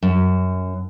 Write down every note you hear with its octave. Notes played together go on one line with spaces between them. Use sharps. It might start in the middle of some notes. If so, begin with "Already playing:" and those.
F#2